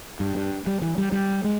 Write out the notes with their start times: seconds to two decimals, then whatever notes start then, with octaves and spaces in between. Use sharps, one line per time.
0.20 G2
0.35 G2
0.67 G3
0.82 E3
0.98 G3
1.12 G3
1.44 G#3